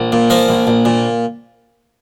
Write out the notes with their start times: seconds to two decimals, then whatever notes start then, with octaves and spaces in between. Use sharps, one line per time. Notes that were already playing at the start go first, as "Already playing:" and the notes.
Already playing: A#1
0.12 A#2
0.30 F3 A#4
0.49 A#1
0.67 A#1
0.85 A#2